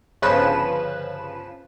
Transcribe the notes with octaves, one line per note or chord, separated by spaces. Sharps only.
G1 C#3 F3 B4 E7